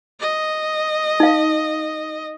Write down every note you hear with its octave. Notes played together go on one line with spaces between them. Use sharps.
D#5
D#4 F5